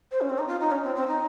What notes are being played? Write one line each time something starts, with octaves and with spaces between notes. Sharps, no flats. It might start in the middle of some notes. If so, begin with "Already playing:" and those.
C5
C#4
C4
D#4
F4
D#4
C#4
C4
C4
D#4